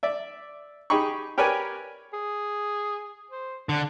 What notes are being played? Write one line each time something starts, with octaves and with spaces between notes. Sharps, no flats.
D5 E5
D#4 G4 G#4 B5 C#6
G4 A#4 B4 C#5 D5 G#5
G#4
C5
D3 D4